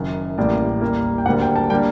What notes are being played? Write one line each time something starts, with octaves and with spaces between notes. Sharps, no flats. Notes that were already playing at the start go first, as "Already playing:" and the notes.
Already playing: F#1 F#2 D#3
A1 A2 G3 A#3 D5
D#2 D#3 G3 A#3
G5
D2 D3 G3 A#3 F#5
G5
A5
D3 G3 A#3 G5